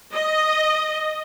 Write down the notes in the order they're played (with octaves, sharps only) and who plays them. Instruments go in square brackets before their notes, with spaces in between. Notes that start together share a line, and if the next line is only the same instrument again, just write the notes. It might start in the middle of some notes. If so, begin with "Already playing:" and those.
[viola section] D#5